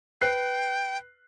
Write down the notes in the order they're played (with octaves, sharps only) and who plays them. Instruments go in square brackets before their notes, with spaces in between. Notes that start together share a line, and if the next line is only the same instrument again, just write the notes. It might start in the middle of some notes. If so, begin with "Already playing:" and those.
[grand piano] B4 F#6 C7 [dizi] G5